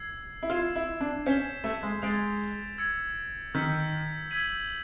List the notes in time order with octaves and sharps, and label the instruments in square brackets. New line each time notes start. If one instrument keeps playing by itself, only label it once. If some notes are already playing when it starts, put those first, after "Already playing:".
Already playing: [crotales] E6 G#6 C7
[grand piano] E4
[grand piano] F4 [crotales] G#6 C7 E7 G7
[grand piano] E4
D4
[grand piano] C#4 [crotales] G6 B6 E7 G7
[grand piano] A3
G#3
[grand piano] G#3 [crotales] A6 D7 F7
[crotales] E6 G#6 C#7
[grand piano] D#3 [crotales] E6 G6 B6
[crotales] E6 G#6 B6 D#7 F#7